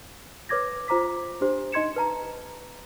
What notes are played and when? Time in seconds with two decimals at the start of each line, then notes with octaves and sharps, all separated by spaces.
0.49 B4 C#5 D6 G#6 A#6
0.88 F4 C5 A#5 D6 B6
1.41 D4 G4 C5
1.72 D#4 D#5 C6 G#6 C#7 E7
1.96 B4 A5 A#5